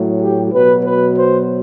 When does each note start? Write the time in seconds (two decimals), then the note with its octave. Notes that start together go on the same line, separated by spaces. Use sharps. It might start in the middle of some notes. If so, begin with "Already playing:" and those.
Already playing: A2 F#3
0.22 G4
0.53 B2 F#3 B4
0.85 B4
1.16 C5